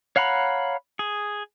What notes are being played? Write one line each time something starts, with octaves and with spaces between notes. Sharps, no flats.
C#5 F5 F#5 A#5 B5
G#4